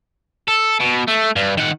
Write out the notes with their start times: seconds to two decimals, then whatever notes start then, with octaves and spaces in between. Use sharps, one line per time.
0.48 A4
0.80 B2
1.08 A3
1.36 G2
1.57 D#3 F#5